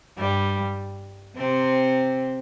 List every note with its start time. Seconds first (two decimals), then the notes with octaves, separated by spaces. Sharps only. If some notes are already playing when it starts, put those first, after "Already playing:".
0.16 G2 G3
1.35 C3 C4